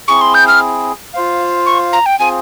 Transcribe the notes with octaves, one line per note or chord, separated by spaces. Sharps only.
C4 E4 G#4 C#6
C6
G6
F6
F4 C5 F5
C#6
A#5
G5
C4 F4 G#4 C5 G#5